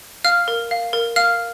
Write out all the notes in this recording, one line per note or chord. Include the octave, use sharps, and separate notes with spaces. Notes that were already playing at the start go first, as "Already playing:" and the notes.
F5 F6
A#4
F5
A#4
F5 F6